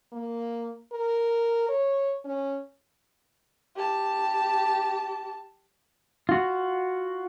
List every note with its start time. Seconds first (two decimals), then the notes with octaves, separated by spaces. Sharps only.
0.12 A#3
0.92 A#4
1.69 C#5
2.25 C#4
3.76 G4 A5
6.29 F4 F#4